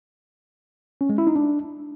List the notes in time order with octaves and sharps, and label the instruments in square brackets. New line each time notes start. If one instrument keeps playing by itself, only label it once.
[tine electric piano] C#4
G#3
E4
D#4
D4